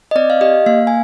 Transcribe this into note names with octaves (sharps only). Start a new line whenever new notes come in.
D#5
C4 D5
F5
G4 D#5
A#3 F5
G#5